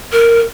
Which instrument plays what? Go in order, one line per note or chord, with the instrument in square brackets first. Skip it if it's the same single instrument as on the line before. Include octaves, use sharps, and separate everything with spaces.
[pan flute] A#4